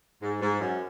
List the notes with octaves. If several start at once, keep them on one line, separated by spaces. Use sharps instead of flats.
G#2
G#2
F#2